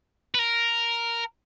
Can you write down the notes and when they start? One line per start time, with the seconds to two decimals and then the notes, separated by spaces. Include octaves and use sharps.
0.35 B4
0.39 A#4